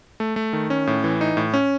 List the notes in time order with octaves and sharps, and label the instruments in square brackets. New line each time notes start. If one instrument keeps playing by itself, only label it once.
[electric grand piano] A3
A3
D#3
C#4
A2
E3
D#4
A2
C#4